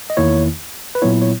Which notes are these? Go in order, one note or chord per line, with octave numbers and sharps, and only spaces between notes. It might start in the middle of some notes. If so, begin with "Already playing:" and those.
D#5
E2 D#3 A#3 E4 C#5
B4
A#2 F#3 B3 E4 C#5
C#5